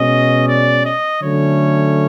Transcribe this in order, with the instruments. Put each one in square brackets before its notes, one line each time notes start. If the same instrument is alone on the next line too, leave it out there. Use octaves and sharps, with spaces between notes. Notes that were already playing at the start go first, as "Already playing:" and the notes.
Already playing: [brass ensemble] B2 G#3 C#4 D#5
D5
D#5
D3 F#3 A3 C#4 C#5